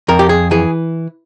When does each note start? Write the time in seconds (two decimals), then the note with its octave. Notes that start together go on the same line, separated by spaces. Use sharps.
0.08 F2 A#4
0.19 G4
0.29 G#4
0.51 E3 G#4